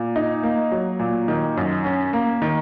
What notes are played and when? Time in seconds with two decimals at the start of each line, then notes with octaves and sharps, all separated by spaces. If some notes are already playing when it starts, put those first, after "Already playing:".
Already playing: A#2
0.16 D#4
0.43 A#3
0.72 F#3
0.99 A#2
1.28 D#3
1.57 F#2
1.84 C#4
2.13 A#3
2.42 D#3